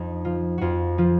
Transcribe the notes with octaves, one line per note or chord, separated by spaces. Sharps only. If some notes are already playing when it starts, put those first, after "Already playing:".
Already playing: F2 D#4
F3 F4
F2 F4 F#4
F3 F4